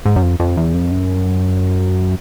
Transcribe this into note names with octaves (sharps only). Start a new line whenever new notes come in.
G#2
F#2
F2
F2
E2
F2
F#2